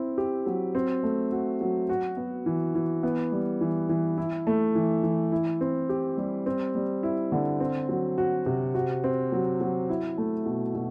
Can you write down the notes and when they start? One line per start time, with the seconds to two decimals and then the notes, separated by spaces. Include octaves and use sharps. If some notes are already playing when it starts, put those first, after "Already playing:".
Already playing: C4 E4
0.18 G4
0.46 F#3
0.75 C4
1.03 A3
1.32 F#4
1.61 F#3
1.89 F#4
2.17 B3
2.46 E3
2.75 E3
3.03 B3
3.32 G3
3.61 E3
3.89 E3
4.18 E4
4.47 A3
4.75 E3
5.03 E3
5.32 E4
5.61 C4
5.89 G4
6.18 G3
6.46 C4
6.75 G3
7.03 E4
7.32 D3
7.60 C4
7.89 F#3
8.18 F#4
8.46 C3
8.75 F#4
9.04 C4
9.32 F#3
9.61 F#3
9.89 E4
10.18 A3
10.46 B2
10.75 B2